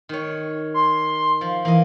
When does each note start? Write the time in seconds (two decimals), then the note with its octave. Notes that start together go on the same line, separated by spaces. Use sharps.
0.09 D#3 C#5
0.74 C6
1.41 F3
1.65 E3 A#3 D#5